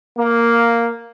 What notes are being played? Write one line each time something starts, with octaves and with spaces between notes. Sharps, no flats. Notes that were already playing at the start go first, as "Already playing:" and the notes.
A#3